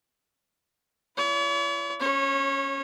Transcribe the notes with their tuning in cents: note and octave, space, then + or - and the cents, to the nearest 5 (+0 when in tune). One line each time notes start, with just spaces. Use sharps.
E4 +40 C#5 +45
C#4 +0 C#5 -25